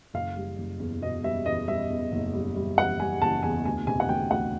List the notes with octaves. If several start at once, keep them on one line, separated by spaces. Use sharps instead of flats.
F#1 F5
G3
F#1
E2
B2 D#5
G3 E5
E2 D#5
G3 E5
E2
F#1
G3
G3
G3 F#5
G3 G#5
F#1 A5
E2 G#5
D2 G#5
C3 G#5
F#5
D2 G5
D2 F#5